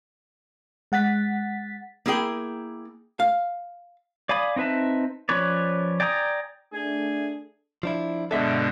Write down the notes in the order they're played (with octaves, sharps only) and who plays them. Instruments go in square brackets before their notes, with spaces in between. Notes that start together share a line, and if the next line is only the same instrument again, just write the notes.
[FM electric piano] G#3 F#5 A6 B6
[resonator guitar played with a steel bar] A#3 E4 G#4 G5
[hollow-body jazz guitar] F5
[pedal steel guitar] D5 F5 G#5 B5 D#6
C4 D#4 B4 E5 A5
F3 C#4 B4 C#5 D5
D5 G5 G#5 A#5 D#6
[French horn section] A3 D4 [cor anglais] G#4
[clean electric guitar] F3 D4 E4
[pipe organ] G2 B2 D3 [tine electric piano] G#3 B3 D4 [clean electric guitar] A4 E5